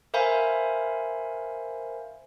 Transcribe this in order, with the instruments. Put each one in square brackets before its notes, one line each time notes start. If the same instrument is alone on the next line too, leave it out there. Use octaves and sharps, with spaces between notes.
[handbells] A#4 C5 E5 F5 G#5 B5